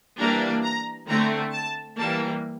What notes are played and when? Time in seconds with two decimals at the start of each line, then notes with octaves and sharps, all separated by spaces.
0.18 E3 G3 A#3 D4 A#5
0.64 A#5
1.08 D3 A3 C4 A#5
1.53 A5
1.97 E3 G3 A#3 A5